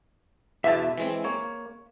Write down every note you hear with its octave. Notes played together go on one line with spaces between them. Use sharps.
E2 B2 E5 A5
E3 G#3 C4
A#3 C#5